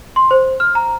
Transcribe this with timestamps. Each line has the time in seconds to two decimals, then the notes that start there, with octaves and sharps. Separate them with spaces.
0.16 C6
0.31 C5
0.60 F6
0.75 A#5